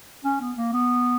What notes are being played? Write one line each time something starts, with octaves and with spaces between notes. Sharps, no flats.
C#4
B3
A#3
B3